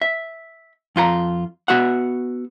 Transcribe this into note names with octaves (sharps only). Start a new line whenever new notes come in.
E5
F2 F4 G4 A#5
B3 F#4 E5 F#5